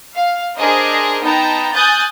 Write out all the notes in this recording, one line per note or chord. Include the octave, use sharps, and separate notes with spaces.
F5
D4 G#4 A#4 C5 D#5
B3 D#4 G5 A5 A#5
G#5 D#6 F#6 G6 A6